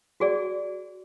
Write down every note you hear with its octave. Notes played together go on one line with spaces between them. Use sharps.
F#4 G#4 D5